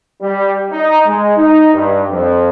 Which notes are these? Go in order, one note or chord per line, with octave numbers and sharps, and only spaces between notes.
G3
D#4
G#3
D#4
G2
F2